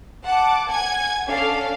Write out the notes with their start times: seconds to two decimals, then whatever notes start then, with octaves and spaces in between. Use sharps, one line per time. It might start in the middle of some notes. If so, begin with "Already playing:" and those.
0.24 F#5 A5 D6
0.68 F#5 G#5 G#6
1.28 C#4 D4 A4 F5